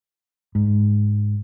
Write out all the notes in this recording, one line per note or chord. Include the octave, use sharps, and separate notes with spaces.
G#2